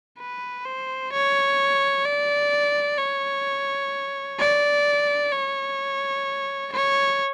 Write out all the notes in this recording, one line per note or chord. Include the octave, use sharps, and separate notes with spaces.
B4
C5
C#5
D5
C#5
D5
C#5
C#5